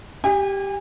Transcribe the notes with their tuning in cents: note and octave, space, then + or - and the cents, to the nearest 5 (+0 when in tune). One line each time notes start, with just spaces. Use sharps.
G4 +0 G#5 -35